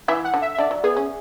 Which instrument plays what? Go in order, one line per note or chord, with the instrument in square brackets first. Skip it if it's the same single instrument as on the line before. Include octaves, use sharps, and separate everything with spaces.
[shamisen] E3 [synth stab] E5
[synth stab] F#5
[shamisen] D3
[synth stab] E5
E5
[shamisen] D3 [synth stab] D5
[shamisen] F#3
[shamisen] B3 [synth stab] G#4
[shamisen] C#4